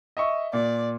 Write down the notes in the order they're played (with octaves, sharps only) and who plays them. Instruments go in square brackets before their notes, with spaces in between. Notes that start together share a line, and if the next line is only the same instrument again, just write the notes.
[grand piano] D#5 E5 C#6
[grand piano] A#2 [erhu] D5